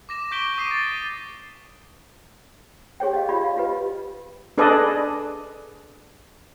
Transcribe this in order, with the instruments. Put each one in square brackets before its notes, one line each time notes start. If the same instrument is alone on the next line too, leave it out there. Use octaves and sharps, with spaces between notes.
[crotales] D6 A#6 E7
C#6 D6 G6 B6 D7 G7
C#6 D#6 B6 C7 D#7
A6
[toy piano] G4 G#4 C#5 G5
D#5 F5
F4 G4 D5 B5
F5
F4 G4 B4 D#5
[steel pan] D4 G#4 A4 B4 D5 D#5